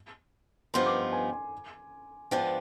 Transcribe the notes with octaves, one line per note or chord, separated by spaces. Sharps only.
G2 F3 B3 D#4 C6
D6
C6
G#5
G#5
G#2 F3 B3 D4 G5